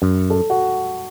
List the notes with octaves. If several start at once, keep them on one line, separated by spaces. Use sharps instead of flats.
F#2
A4
F#4